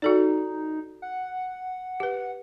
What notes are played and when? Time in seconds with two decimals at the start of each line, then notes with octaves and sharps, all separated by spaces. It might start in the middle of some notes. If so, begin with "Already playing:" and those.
0.02 D#4 F#4 A4 D5
1.02 F#5
2.00 G4 B4